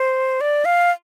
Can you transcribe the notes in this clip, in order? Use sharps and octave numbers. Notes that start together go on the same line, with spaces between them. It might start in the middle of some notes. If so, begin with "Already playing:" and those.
Already playing: C5
D5
F5